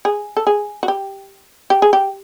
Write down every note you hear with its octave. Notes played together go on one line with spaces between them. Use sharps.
G#4
A4
G#4
F#4
G4
G4
G#4
G4